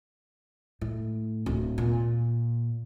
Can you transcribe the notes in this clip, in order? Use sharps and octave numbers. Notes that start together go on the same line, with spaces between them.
A2
D1
A#2